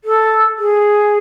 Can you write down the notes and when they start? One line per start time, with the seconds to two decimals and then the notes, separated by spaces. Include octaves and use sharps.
0.04 A4
0.59 G#4